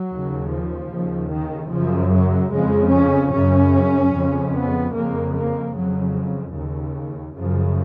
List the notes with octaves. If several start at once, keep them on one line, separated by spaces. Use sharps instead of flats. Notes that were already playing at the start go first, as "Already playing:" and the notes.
Already playing: F#3
D#2 C#3
F3
D#2 C#3
D#3
F#2 C#3 F3
F#3
F2 C#3 G#3
C#4
F#2 C#3 C#4
F2 C#3
B3
F2 C#3 A#3
A#3
F2 C#3 F#3
D#2 C#3
F#2 C#3 F3